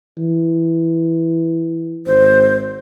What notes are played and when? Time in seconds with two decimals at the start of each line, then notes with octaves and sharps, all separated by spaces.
0.18 E3
2.06 G#1 C5